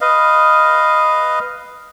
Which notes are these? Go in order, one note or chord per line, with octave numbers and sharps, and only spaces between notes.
B4 D#5 F5